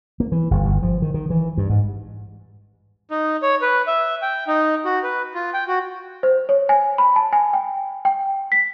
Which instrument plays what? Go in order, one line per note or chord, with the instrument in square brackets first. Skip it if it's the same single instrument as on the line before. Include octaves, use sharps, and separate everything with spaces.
[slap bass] A#3
E3
G1
G1
F3
D#3
D#3
E3
G2
G#2
[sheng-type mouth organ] D#4
C#5
B4
E5
G5
D#4
F#4
B4
F4
G5
F#4
[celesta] C5
C#5
G#5
B5
A5
G#5
G5
G5
B6